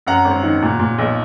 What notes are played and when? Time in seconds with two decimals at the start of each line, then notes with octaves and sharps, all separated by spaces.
0.07 F#2 F#5 A#5
0.25 G#1
0.43 D#3
0.62 A#2
0.79 A#2
0.98 B1